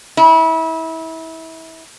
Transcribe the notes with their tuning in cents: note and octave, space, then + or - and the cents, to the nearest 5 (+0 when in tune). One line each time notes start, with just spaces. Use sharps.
E4 -30